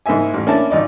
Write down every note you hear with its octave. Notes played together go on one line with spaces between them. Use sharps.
G#2 A#3 E4 E5 G#5
A1
A#3 C#4 D4 E4 G#5 A5
G#1 D#4 D5